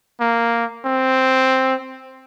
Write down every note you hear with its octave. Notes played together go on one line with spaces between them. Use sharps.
A#3
C4